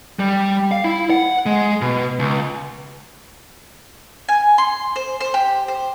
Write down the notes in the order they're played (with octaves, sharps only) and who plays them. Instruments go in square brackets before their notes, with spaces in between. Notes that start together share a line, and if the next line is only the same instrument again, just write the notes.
[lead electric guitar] G3
F5
E4
F#5
G#3
B2
C#2
[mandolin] G#5
C6
C5
C5
G4
C5